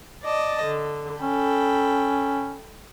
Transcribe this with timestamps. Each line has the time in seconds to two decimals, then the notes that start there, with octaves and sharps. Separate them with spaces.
0.24 D5 D#5 A5
0.65 D3
1.22 C#4 A4 G5 B5